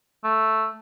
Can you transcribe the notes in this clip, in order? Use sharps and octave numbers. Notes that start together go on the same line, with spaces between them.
A3